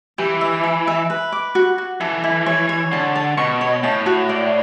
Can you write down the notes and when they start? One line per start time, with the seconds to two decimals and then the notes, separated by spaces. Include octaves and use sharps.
0.18 E3 G4
0.41 E5
0.64 B5
0.87 E5
1.10 B4
1.32 D6
1.55 F#4
1.78 F#4
2.01 E3 A4
2.24 E4
2.46 C#5
2.69 C#5
2.92 D3 A5
3.16 A5
3.37 B2 C#6
3.61 C#5
3.83 A2 A5
4.06 F#4
4.29 D5